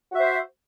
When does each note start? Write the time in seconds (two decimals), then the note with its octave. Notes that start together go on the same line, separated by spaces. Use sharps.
0.12 F#4
0.16 E5
0.19 C5